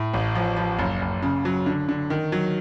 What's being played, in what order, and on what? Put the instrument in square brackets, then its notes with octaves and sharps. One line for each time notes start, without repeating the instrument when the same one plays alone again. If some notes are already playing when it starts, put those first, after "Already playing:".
Already playing: [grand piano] A2
A1
F3
F3
F#1
F#1
C#3
F#3
D3
D3
D#3
F#3